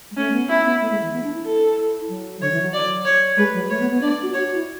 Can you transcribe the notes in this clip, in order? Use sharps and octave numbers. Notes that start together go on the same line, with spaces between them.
G#3
A3 C#4
B3
C#4 E4
B3
A3
G#3
E3
B3
D4
E4
A4
F#3
D3 C#5
E3
F#3
D5
C#5
G#3 B4
F#3
A3 C#5
B3
B3
D4 D5
F#4
F#4 C#5
F#4
E4